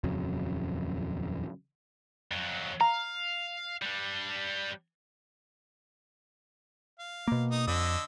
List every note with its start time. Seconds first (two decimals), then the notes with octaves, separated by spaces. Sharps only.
0.04 D#1 F2 C#3 F#3
2.32 F2 F#3
2.81 F5 A#5
3.82 G3 D4
6.99 F5
7.28 B2 A#3
7.51 D#4 D#6
7.67 F2 D3 D#5 E6